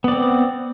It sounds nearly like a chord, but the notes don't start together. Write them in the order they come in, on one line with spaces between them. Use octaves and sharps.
B3 D5 C4